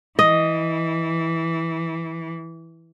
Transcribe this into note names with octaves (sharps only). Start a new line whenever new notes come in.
E3 D#5